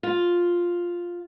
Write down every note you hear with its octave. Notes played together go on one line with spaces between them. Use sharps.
F4